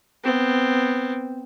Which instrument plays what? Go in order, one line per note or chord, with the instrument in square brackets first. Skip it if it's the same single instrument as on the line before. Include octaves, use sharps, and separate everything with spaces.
[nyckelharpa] B3 C4